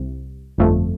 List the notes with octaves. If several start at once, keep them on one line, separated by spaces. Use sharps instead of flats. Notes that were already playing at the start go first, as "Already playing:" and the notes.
Already playing: C2 C3
G1 F2 F3 A3